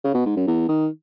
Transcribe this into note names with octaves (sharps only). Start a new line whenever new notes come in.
C#3
B2
G#2
F#2
E2
D#3